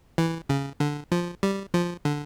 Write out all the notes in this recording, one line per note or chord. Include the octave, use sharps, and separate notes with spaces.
E3
C#3
D3
F3
G3
F3
D3